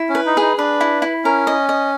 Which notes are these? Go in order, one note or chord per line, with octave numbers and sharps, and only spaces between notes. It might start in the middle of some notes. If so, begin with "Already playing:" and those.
Already playing: E4
C#4
B4
D#4
D#4 G#4
D4 B4
E4
E4
C#4 A#4
D#5
D#5